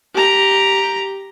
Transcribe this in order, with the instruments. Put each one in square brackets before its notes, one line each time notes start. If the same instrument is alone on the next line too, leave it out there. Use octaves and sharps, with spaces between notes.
[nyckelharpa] G4 A#5